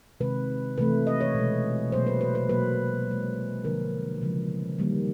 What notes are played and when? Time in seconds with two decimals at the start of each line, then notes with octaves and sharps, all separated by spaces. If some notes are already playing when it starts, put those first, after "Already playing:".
0.20 C3 D#3 G#3 B4
0.78 C3 E3 A3 B4
1.07 D#5
1.21 C#5
1.35 B2 G#3
1.92 B2 F#3 A#3 C5
2.07 B4
2.21 B4
2.35 B4
2.49 B2 F#3 A#3 B4
3.07 B2 G#3
3.65 D3 F3 A#3 A#4
4.21 C#3 F3 G#3
4.78 D#3 G3 A#3